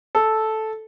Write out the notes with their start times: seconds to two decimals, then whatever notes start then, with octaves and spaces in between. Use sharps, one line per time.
0.15 A4